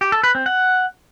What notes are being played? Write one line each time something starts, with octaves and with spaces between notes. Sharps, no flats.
G4
A4
B4
C4
F#5